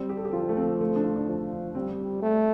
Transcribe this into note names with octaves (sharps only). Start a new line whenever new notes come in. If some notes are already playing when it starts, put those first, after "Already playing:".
Already playing: G3 C4
G4
A4
G4
F3 F4
A3
C4
A3
D4
F4
D4
F3
G3 C4
C4
A3 G4